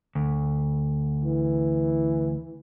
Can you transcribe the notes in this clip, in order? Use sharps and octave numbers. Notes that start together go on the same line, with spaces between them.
D2
E3